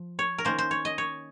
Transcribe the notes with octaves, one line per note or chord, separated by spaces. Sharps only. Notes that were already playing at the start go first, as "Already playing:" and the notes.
Already playing: F3
C#5
A#4
D#3 A#3 C#4 C5
C5
C#5
D#5
C#5